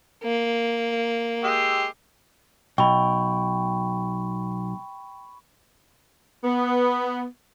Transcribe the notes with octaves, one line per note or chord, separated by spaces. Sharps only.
A#3
G#3 G4 E6
B1 G5 B5 C#6
B3